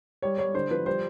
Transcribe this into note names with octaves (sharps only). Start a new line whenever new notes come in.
G3 C#5
G3 C#5
D3 C5
F3 B4
G3 C5